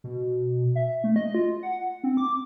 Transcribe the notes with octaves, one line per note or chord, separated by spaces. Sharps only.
B2
E5
A3
D#5
F4
F#5
C4
D6